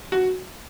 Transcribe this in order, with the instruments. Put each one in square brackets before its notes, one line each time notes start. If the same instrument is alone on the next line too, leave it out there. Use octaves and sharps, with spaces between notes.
[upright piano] F#4